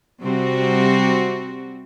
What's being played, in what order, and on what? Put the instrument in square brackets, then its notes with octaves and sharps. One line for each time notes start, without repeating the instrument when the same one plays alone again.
[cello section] C3 G3 C4 F#4